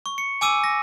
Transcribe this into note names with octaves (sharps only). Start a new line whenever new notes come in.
C#6
C#7
G#5 D6 E6 D#7
A#6